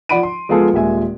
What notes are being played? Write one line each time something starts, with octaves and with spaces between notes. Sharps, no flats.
F3 D5 F#5 B5 D7 D#7
C6
F3 G#3 B3 F4 G#4 A4
D#1 A#2 G#3 E5 G#5